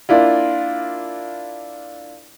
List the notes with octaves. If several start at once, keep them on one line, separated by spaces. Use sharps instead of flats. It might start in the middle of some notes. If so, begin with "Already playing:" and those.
A#3 D4 E4 F4